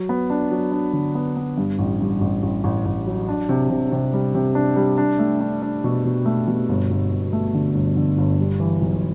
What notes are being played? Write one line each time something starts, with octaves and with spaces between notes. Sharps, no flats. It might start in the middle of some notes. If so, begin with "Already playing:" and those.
Already playing: F#3
B3
D4
F#3
D4
D3
B3
B3
G2
A1
G2
A1
A1
A1
A1
F#3
D4
C3
C3
C3
G3
C3
D4
G3
D4
A3
D4
D4
B2
B2
A3
B2
G1
G1
G1
A3
D3
G1
D3
G1
G3
E3
B1